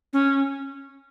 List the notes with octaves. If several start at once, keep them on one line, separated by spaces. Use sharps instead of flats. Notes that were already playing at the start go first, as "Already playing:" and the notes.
C#4